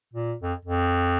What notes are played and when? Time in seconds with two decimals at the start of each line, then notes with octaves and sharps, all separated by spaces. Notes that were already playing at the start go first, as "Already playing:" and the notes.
0.14 A#2
0.42 F2
0.65 F2